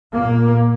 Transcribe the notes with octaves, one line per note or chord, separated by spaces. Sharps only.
A#2 A#3